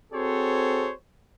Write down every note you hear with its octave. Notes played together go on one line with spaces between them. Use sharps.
C4 F#4 G#4 A4 C5 C#5